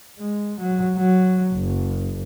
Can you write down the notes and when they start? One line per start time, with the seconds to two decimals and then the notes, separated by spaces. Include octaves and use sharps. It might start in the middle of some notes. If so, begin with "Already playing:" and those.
0.19 G#3
0.60 F#3
0.98 F#3
1.53 F#1